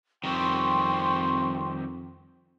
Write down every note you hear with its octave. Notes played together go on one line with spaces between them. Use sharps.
F2 D#3 G3 C4 G5 C6 C#6